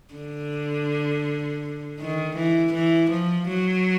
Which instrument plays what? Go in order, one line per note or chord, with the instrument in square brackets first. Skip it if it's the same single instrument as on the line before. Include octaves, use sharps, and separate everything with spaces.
[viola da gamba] D3
D#3
E3
E3
F3
F#3